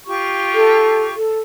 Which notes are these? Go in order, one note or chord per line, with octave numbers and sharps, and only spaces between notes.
F4 G4 C#6
A4
A4